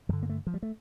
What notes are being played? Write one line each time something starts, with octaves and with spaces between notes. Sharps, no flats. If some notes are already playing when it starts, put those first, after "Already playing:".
G2 D3 F3
A#3
A3
F3
G3
A3